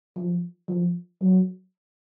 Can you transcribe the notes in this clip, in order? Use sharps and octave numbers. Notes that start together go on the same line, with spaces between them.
F3
F3
F#3